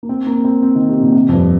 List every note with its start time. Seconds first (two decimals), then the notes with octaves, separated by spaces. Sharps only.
0.03 A#3
0.09 C4
0.27 A#3
0.44 C4
0.62 C4
0.75 D#3
0.89 C3
1.02 A#2
1.15 C3
1.29 F2
1.33 G2